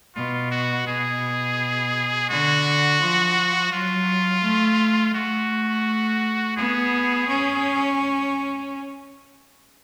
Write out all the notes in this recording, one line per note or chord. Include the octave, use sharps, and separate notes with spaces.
B2 F4
F#4
B2 G#4
D3 F#4
F3
F#3 F4
A3
A3 F#4
B3 G#4
C#4